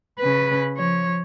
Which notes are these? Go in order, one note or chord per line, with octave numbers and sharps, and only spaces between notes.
C#3 B4
F3 C#5